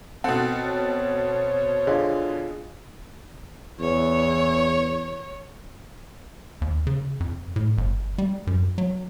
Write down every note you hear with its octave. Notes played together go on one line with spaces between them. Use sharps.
B2 C4 A4 F#5
C5 C#5
D3 F4 G#4 D#5
E2 C#5
D#2
C#3
F2
A2
G1
G3
F#2
F#3